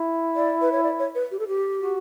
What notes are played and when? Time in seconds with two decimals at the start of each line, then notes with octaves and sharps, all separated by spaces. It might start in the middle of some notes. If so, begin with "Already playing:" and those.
Already playing: E4
0.36 D5
0.61 B4
0.72 C#5
0.83 D5
0.99 C#5
1.15 B4
1.31 G4
1.39 A4
1.48 G4
1.79 F#4